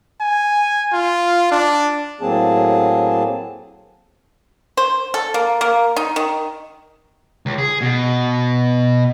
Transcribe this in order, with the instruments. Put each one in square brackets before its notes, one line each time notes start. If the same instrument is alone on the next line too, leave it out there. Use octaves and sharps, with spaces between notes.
[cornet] G#5
F4
D4
[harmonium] A2 F#3 A#3 C4 G#4 A5
[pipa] C5
A4
A#3
A#3
D#4
D#3
[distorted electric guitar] C#2
G#4
B2